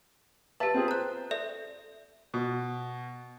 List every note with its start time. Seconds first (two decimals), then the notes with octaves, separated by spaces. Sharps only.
0.60 G4 B4 E5 A5
0.74 C4 F4 G#4
0.88 C5 A#5 F#6
1.31 A4 D5 E5
2.34 B2